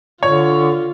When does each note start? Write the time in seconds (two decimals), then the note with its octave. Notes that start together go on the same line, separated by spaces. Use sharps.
0.23 D3 F4 C#5